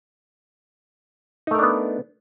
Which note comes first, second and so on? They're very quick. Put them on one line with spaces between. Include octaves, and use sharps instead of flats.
D#4 A3 A#4 D4 B3